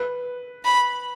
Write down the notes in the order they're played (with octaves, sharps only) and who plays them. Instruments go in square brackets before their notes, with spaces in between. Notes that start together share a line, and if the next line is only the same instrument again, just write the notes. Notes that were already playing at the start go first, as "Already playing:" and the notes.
Already playing: [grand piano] B4
[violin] B5